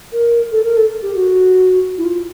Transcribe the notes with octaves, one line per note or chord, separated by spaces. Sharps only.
A#4
A4
A#4
A4
G4
F#4
E4
F4